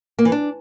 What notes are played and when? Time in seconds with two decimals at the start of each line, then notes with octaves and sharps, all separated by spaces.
0.19 A#3
0.25 E3
0.32 D4